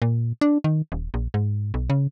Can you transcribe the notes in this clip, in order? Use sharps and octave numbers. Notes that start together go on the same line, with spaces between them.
A#2
D4
D#3
D#1
A#1
G#2
B1
C#3